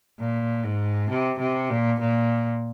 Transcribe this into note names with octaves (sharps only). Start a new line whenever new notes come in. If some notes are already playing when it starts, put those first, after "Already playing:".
A#2
G#2
C3
C3
A#2
A#2